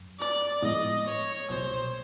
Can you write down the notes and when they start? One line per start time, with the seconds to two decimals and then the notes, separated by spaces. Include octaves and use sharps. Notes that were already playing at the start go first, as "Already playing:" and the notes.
Already playing: F#2
0.19 D5
0.62 A2 F3 G#3 B3 E4 D#5
1.07 C#5
1.49 C2 B2 G3 C5